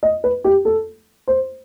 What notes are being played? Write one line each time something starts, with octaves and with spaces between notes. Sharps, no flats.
D#5
B4
G4
A4
C5